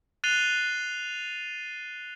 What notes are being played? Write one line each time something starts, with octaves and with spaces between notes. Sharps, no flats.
F#6 A6 C7 D#7 F7 G7